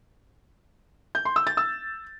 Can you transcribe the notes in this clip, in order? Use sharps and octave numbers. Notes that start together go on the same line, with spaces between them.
G6
C6
E6
A6
E6